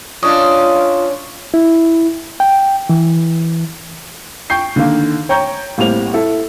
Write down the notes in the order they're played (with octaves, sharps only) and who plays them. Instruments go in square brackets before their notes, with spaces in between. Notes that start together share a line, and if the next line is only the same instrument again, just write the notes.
[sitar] C#4 D4 [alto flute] F4 [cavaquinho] D#5
[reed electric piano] E4
G5
E3
[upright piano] G5 C#6 G6 C7
D3 D#3 A#3
C#5 G5 A#5 C#6 G6
A1 A2 G3 A#3 C4 F7
E4 A4